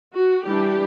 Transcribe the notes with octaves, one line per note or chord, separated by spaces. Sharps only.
F#4
E3 G3 D4 G4